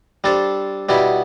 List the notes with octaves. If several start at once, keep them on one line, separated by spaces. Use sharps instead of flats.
G3 D4 A4 C5
B2 G3 B3 E4